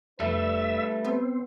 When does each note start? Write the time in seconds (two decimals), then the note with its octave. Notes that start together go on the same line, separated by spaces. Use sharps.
0.20 F1 G3 A3 D4 B4 E5
1.05 B3 C4